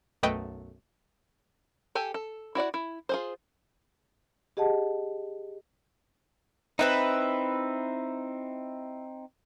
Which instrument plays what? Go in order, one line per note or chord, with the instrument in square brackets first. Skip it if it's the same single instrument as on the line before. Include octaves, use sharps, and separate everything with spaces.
[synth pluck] B1 F#2 A3 B4 D#5 G5
[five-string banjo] G4 A4 G#5
A4
E4 F#4 D5 F#5
E4
F4 G#4 C5
[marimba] G4 G#4 D#5 F#5 A5
[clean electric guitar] C4 D#4 [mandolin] E4 B4 E5